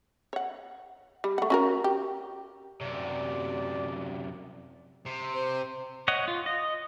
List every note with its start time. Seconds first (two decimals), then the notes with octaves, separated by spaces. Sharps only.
0.33 C#5 F#5
1.24 G3
1.38 A3 F#5
1.50 C#4 F#4 A#4
1.84 G4
2.81 F#2 C3 D5
5.06 C3
5.33 C5
6.08 C#5 D#5 F#5
6.28 F4
6.46 D#5